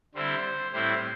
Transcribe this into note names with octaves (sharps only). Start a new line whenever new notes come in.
D3 G3 C4 E4 C5
A2 G3 C4 E4 C5